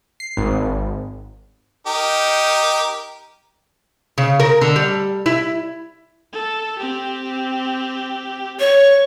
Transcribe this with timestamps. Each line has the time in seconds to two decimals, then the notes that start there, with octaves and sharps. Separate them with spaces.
0.20 C7
0.37 G#1
1.87 D#4 G4 A#4
4.18 C#3
4.40 A#4
4.61 D3
4.76 G3
5.26 E4
6.32 A4
6.78 C4 G4
8.60 C#5 C#6